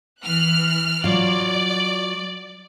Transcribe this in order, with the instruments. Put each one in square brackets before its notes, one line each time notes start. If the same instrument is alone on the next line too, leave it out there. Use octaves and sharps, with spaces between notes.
[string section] E3 F6 F#6
[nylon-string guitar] F#3 F4 [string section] D5